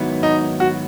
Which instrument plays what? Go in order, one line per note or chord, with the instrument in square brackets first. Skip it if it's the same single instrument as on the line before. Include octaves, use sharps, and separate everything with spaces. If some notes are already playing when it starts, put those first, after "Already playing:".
Already playing: [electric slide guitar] G#2 D#3 F#3 B3 E4
[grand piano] D#4
F#4